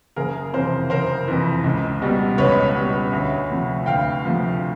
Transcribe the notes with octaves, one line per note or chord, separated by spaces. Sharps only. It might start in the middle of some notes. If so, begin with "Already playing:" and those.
F#1 G#4 A#4
F2 C3 E3 A#4 C5
F#1 A#4 C5
F2 C3 E3
C#2
B2 G3
C#2 B4 C#5
B2 G3
D2
C3 F3 A3
D2 F5 G5
C3 F3 A3